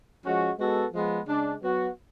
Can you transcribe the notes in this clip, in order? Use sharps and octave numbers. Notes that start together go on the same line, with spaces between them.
F3 G#3 C#4 F#4
G#3 B3 F#4 A4
F3 G#3 B3
C#3 G#3 D4
F#3 B3 F#4